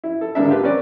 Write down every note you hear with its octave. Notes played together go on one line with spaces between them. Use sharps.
E4
A4
D3 G#3 A#3 D4 E5
F4 G4 B4
C4 C#4 A#4 B4 D5